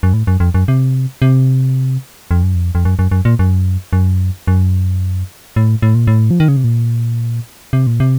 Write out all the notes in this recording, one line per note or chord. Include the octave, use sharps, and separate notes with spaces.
F#2
A2
F#2
F2
F#2
C3
C3
F2
F#2
F2
F2
F#2
F#2
F#2
A#2
F#2
F#2
F#2
A2
A2
A#2
A2
F3
D#3
C#3
C3
A#2
C3
A#2
C3